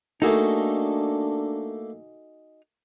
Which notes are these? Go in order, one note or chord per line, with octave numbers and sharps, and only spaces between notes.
A3 A#3 D4 D#4 F#4 G#4 A4